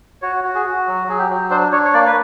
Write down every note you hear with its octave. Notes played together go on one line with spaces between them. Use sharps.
F#4 C#5
F#4
G#4
F#4
F#3
F#3 G#4
G4
F#3
D4 C5
D4 C#5
C#5
A#3 D5
B4